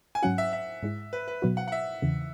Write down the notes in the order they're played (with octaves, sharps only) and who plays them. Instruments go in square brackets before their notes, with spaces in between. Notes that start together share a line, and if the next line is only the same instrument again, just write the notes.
[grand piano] G#5
[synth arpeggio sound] G#2 F#3 C#4 F#4 [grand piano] F#5
[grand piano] E5
E5
[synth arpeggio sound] G#2 G#3 E4
[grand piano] B4
B4
[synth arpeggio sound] B2 F#3 B3 F#4
[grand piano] F#5
F#5
E5
[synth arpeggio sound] E2 C#3 E3